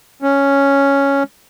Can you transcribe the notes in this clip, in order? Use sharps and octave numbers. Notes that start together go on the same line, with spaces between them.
C#4